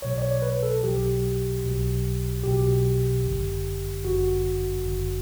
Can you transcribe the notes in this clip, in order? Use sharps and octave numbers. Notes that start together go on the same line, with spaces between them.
B1 B2 F#3 C#5
D5
C#5
B4
A4
B1 B2 F#3 G4
B1 B2 F#3
B1 B2 F#3 G4
G1 F#2 D3
G1 F#2 D3 F#4
G1 F#2 D3